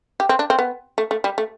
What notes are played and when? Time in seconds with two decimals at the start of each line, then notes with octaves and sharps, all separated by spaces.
0.20 G4
0.29 C4
0.39 D4
0.50 C4
0.59 B3
0.98 A3
1.11 A3
1.24 G3
1.38 A3